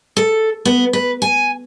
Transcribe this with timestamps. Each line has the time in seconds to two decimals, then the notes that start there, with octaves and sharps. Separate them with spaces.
0.17 A4
0.65 B3
0.93 B4
1.22 G#5